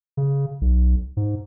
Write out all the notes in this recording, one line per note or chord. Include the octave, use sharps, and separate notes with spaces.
C#3
B1
G#2